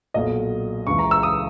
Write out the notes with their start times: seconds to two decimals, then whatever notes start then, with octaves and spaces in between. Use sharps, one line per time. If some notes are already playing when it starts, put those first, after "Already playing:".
0.14 B1 A#2 F#3 D#5
0.87 C#2 C#3 E3 C#6
0.99 A#5
1.11 E6
1.23 D#6